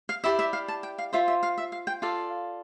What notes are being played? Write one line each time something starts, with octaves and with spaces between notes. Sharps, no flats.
F5
E4 G4 D5 E5
E5
F5
A5
G5
F5
F4 C5 E5
E5
F5
E5
F5
G5
F4 A4 D5 F5